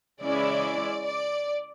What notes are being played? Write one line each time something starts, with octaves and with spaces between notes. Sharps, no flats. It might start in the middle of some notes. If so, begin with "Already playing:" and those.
C#3 E3 G#3 C#4 E4 D5
D5